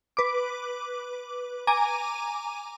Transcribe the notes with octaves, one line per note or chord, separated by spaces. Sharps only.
B4 D6
G#5 A#5 D6 D#7